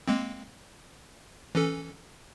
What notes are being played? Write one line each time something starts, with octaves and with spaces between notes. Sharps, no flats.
G#3 A#3 C4
E3 C#4 A4